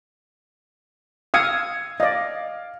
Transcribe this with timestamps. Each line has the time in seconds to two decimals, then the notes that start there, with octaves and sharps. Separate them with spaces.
1.34 F5 D#6 E6 G#6 C#7
2.00 D5 D#5 F5